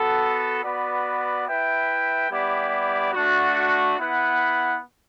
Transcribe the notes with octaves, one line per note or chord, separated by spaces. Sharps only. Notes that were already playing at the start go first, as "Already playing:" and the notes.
Already playing: B3 F#4 A4
B3 F#4 B4 D5
E4 B4 E5 G5
G3 B3 E4 G4 D5
A3 D4 F#4
B3 E4 B4 F#5